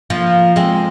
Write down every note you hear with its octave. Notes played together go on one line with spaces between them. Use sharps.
F3 A#3
G#3 C4